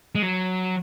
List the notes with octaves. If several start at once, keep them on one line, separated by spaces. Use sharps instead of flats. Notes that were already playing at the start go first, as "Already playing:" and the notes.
G#3
F#3